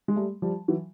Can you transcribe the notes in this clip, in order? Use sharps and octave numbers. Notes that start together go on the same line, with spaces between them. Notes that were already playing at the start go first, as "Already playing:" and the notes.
G#3
G3 A3
F3 G3
E3 F#3